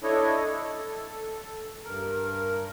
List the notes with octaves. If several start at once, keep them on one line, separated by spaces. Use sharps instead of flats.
D4 E4 A4 C#5 D#5
A4
G2 A#4